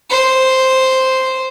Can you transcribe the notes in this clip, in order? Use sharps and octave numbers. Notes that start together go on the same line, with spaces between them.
C5